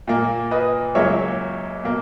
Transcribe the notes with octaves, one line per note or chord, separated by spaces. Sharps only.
A#2 A#3
B4 D#5
C#2 C#3 F#3 A#3 C#5 E5
B2 A#3